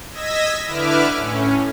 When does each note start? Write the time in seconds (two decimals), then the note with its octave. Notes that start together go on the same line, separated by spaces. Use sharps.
0.11 D#5 E6 G#6 A#6 B6
0.67 D3 E4 B4 E5 D6 F6
1.15 A2 C#4